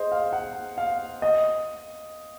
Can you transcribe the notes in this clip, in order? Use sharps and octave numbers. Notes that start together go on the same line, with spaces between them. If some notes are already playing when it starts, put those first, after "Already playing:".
Already playing: G#4 C5 D#5
F5
F#5
F5
D#5